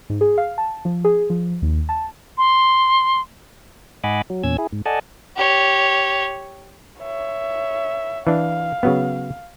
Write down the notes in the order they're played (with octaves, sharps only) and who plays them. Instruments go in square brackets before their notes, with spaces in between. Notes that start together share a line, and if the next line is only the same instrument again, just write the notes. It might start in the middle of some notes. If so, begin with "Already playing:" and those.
[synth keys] G#2
G#4
F5
A5
F3
G#4
F3
D#2
A5
[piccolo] C6
[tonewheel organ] G#2 D#5 F#5 G#5 B5 D6
F#3
E2 A#2 C#4 E6 G#6
E4 G#4
G#2
A4 D5 D#5 F#5 G#5 A5
[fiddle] G4 C#5
[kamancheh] C#5 E5
[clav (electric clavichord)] E3 D4 [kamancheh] F5
[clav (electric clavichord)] C#3 F#3 B3